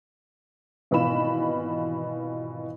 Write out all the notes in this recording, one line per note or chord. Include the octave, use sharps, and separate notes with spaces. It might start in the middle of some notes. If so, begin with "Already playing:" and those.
G#1 B2 E3 F4 B5 E7